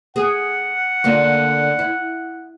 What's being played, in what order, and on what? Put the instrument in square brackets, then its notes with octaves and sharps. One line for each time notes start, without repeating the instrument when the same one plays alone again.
[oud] G#4 [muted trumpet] F#5
[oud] D3 A#3 F4
E4